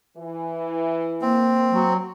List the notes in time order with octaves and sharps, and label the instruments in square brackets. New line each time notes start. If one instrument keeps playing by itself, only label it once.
[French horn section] E3
[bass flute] A#3 [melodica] C4
[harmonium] F#3